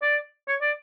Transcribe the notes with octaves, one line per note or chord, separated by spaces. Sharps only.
D5
C#5
D5